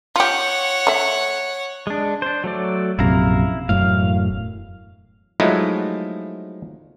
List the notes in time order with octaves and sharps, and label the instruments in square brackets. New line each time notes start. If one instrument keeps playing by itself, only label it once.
[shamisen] F4 G4 [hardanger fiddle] C#5 F#5
[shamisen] A3 E5
[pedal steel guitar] G#3 D4
D4 C5
F#3 A3 D5
[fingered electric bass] A#1 F#2 C3 [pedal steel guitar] E4 F5 A#5
[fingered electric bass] E1 F#2 A2 [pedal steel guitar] F5
[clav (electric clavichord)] F3 F#3 G#3 A3 D#4 E4